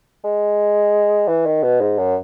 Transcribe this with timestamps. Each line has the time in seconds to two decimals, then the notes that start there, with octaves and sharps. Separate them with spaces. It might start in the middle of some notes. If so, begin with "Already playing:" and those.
0.24 G#3
1.28 E3
1.46 D#3
1.63 B2
1.81 G#2
1.98 F#2